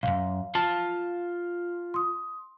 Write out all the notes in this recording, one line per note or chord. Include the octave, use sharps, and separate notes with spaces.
B1 F#2 F5
F4 A5
C6 D#6